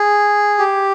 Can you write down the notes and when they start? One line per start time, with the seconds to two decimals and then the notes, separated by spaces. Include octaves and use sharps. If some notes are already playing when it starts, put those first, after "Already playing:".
Already playing: G#4
0.59 G4